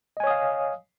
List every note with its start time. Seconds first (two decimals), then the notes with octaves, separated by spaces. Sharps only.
0.17 D#5
0.20 G#5
0.24 C#5
0.27 D#6
0.30 F5